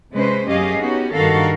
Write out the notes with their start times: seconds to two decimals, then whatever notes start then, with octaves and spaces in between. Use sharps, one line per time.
0.12 C3 G#3 C#4 B4 C5
0.48 F#2 C#4 G4 G#4 D#5 F5
0.79 B3 C#4 D#4 F#4 G4
1.13 G2 D#3 F#4 A4 A#4 F5